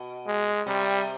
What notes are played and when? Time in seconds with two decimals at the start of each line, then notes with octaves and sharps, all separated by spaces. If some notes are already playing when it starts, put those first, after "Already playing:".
Already playing: B2
0.27 G#3
0.67 C3 G3